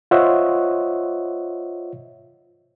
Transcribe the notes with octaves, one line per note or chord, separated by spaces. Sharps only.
F4 C5 C#5 D#5 E5 F#5